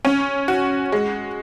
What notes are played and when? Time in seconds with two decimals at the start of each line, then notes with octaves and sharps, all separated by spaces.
0.05 C#4
0.48 F#4
0.92 G#3